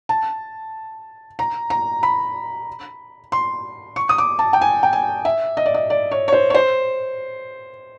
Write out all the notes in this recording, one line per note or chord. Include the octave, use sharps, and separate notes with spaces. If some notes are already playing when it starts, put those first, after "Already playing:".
A5
A#5
A#5
B5
C6
C#6
D#6
D6
A5
G5
G#5
G5
G#5
E5
D#5
D5
D#5
D5
C#5
C#5
C5
C#5
C5